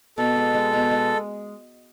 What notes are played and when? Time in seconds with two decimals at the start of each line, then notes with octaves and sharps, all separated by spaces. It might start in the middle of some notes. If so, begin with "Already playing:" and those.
0.18 B2 A4
0.36 G#3
0.54 G#3
0.73 B2
0.91 G#3